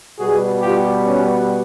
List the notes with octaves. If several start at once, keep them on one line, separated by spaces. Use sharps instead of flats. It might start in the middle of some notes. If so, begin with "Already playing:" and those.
B2 G3 B3 F#4 G#4
F4 G4
C#4